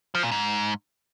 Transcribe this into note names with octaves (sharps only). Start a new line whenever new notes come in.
F3
A#2
G#2